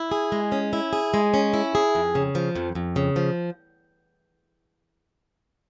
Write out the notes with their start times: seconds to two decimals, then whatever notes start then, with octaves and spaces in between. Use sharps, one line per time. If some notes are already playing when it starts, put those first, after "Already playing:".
Already playing: E4
0.12 G#4
0.32 G#3
0.52 C#4
0.73 E4
0.93 G#4
1.14 G#3
1.34 C#4
1.53 E4
1.75 G#4
1.95 F2
2.15 C#3
2.35 F3
2.56 F2
2.75 F2
2.96 C#3
3.16 F3